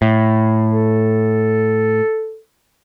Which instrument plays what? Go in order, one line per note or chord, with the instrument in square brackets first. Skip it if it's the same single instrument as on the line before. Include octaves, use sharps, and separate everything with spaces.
[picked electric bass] A2
[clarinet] A4